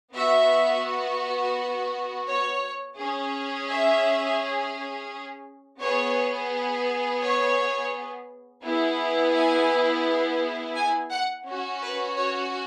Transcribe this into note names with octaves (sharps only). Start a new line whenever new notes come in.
B3 F#4 E5
C#5
C#4 G#4
E5
B3 G#4 C#5
C#5
B3 E4 G#4
G#5
G#5
F#5
C#4 F#4
B4
C#5